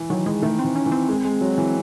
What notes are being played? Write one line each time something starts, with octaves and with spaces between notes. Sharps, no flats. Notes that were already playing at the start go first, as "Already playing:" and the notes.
Already playing: E3
D#3 F#3
E3 G#3
D#3 A3
C4
E3
C#4
E3
C4
G#3
G#3
F#3
E3